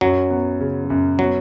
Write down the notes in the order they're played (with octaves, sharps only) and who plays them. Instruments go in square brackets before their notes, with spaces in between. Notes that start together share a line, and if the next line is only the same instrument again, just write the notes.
[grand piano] F#2 [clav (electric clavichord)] F#3
[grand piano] B3
C#3
F#2
[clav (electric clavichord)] F#3 [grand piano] B3